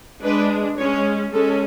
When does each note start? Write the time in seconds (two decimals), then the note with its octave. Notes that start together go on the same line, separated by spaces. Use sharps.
0.22 G#3 D4 B4
0.77 G#3 C#4 C#5
1.32 G#3 C#4 A4